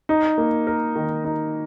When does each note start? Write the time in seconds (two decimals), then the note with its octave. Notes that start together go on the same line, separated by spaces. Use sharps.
0.09 D#4
0.38 A#3
0.67 A#4
0.96 D#3
1.24 D#4